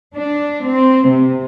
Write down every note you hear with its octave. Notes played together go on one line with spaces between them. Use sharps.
D4
C4
C3